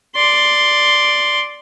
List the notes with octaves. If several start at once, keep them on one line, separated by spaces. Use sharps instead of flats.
D5 C6